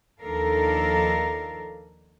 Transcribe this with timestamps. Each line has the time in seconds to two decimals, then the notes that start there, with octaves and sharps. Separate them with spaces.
0.20 D#2 F3 D4 A4 A#4 F5